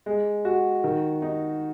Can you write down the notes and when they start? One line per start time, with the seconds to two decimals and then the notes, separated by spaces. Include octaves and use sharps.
0.06 G#3
0.45 F#4
0.84 D#3
1.22 D#4